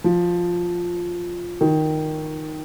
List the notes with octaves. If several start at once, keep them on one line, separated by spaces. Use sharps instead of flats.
F3
D#3